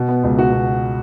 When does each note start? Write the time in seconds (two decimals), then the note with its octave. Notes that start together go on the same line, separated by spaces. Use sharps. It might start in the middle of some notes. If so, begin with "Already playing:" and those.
Already playing: B2
0.08 B3
0.23 C#2
0.38 F#4
0.52 B2